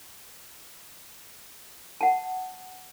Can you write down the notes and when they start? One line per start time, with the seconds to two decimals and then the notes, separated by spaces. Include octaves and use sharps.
2.01 F#5 A5